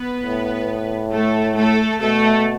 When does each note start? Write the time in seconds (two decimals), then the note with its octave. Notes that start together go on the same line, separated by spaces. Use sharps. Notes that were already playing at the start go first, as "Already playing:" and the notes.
Already playing: B3 B4
0.22 A2
1.11 A3 A4
1.56 A3 A4
2.00 B2 A3 A4